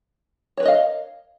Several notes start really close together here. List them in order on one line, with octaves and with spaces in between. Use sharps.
C#5 B4 A#4 D#5 F5